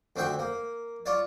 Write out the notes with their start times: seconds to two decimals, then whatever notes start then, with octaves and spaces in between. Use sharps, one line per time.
0.16 D2 C4 F#4 E5 G5 C#6
0.39 A#3
1.06 F4 C#5 D5